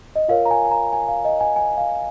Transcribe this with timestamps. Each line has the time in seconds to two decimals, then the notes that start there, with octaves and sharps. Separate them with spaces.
0.16 D#5
0.28 F4 A#4 C#5 F5
0.45 A#5
0.51 G#5
0.65 G#5
0.71 A#5
0.93 G#5
1.08 F5
1.25 D#5
1.41 G#5
1.56 G#5
1.78 F5